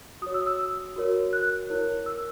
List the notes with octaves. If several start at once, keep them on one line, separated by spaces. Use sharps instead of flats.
F#4 C#5 D#6
E6
E6
F#4 A#4 C#5
F#6
E4 A#4 C#5
E6